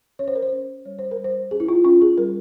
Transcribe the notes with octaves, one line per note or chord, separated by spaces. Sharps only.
C#4 C#5
C5
A#4
C5
C#4
G3 C#5
C5
A#4
G3
C5
C#4 G#4
E4
F4
C#4 F4
G#4
G3 A#4